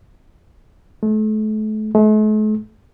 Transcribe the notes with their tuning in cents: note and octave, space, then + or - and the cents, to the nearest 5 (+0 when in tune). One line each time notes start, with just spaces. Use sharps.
A3 -35
A3 -45